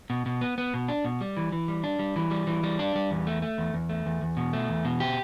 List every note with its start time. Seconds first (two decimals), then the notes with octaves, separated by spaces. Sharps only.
0.10 B2
0.26 B2
0.41 B3
0.58 B3
0.74 B2
0.88 D4
1.05 B2
1.21 G3
1.37 E3
1.52 E3
1.68 G3
1.84 D4
1.99 G3
2.16 E3
2.31 G3
2.47 E3
2.64 G3
2.79 D4
2.95 G3
3.11 E2
3.27 A3
3.42 A3
3.58 E2
3.74 E2
3.89 A3
4.06 E2
4.22 E2
4.37 B2
4.53 A3
4.69 E2
4.85 B2
5.00 G4